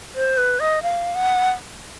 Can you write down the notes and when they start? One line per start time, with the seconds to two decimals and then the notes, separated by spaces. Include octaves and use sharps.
0.15 C5
0.37 B4
0.60 D#5
0.83 F5
1.15 F#5